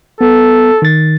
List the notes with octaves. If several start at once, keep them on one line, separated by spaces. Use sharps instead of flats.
B3 A4
D#3 A6